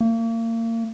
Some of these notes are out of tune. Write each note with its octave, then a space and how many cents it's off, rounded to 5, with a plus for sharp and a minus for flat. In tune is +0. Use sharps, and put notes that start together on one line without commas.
A#3 -35